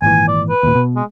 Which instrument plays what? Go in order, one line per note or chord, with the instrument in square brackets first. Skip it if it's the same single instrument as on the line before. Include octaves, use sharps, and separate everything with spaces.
[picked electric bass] G#1 A#2 E3 [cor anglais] G#5
[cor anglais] D5
B4
[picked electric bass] D#2 A#2
B2
[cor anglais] G#3